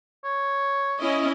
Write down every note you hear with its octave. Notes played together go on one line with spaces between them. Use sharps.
C#5
C#4 E4 D#5